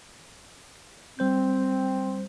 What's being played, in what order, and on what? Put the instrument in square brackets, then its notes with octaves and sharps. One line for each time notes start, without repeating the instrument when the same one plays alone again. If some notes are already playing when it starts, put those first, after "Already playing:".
[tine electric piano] G3 C5 G6 [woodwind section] C4